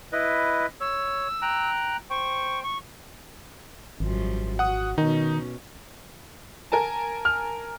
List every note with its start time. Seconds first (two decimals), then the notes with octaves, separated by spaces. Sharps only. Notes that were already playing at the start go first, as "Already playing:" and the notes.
0.12 E4 B4 D#5
0.80 C#5 E6
1.42 G5 A#5 F#6
2.10 C5 G5 C#6
2.63 C#6
4.00 G#1 F#2 F3 G3
4.59 F#4 F#5 D#6
4.98 B2 D#3 C#4 D#4
6.72 A#4 G#5 A5
7.25 F6